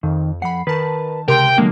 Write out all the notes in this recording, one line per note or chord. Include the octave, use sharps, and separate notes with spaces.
F2 D#3
F2 F#5 B5 C7
D#3 A#4 B4 A5
C#2 C3 G4 A#4 G5 C6
D3 F#3 G#3 A#3